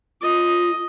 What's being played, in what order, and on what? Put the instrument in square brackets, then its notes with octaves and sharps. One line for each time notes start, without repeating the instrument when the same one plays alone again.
[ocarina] F4 [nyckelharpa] D#5